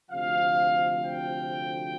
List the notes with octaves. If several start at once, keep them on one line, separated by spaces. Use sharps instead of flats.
D2 C3 F3 F5
G5